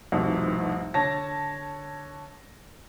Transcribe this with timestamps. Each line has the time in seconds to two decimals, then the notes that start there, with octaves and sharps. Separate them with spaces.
0.12 F1 C2 F2 G#2 B2
0.94 D3 C#5 A5 A#6